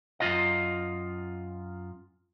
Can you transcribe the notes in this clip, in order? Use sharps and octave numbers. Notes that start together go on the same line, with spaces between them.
F#2 F4 D#5